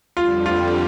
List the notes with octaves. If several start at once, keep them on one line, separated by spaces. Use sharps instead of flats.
F2 D3 G3 F4
F4